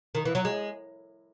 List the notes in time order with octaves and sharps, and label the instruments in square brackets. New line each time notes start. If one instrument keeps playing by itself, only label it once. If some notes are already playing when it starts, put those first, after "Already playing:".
[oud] D#3
E3
F#3
G#3